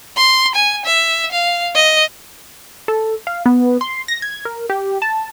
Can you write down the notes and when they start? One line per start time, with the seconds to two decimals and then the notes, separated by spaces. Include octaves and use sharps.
0.17 C6
0.55 G#5
0.85 E5
1.32 F5
1.75 D#5
2.88 A4
3.27 F5
3.46 B3
3.81 C6
4.08 A#6
4.22 G#6
4.45 A#4
4.70 G4
5.02 A5